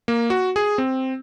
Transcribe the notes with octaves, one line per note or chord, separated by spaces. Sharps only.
A#3
F#4
G#4
C4